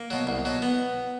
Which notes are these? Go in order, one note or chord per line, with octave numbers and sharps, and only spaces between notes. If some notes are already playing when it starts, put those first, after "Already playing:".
Already playing: A#3
B2 F#3
C2
B2 F#3
B3